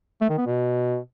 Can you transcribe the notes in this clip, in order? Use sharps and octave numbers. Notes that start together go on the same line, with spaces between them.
A3
D#3
B3
B2